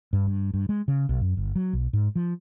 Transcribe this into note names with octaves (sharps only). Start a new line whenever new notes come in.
G2
G2
G2
G#3
C#3
B1
F#2
G1
F#3
B1
G#2
F3